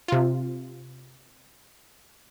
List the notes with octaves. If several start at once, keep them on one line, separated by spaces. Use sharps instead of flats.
C3 F4